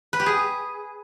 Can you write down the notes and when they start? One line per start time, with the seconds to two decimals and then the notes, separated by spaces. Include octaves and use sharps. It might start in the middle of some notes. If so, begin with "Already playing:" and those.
0.13 B4
0.20 G4
0.26 G#4